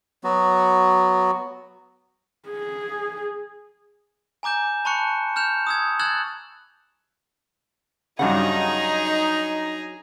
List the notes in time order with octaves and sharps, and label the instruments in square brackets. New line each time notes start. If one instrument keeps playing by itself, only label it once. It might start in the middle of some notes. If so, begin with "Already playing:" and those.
[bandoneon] F#3 B3 F#4
[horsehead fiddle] G#4
[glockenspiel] G#5 A#5 D6 G6 E7
A5 B5 C#6 F#6 C#7
F6 G6 E7 F7
D#6 E6 G#6
E6 F#6 G#6 A6 E7 F#7
[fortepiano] G2 C#3 [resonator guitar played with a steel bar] F#3 D4 F#5 [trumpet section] D#4 [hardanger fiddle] G#4 A#5